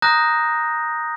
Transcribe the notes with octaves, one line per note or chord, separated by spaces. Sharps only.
A#5 D#6 F#6 G6 A#6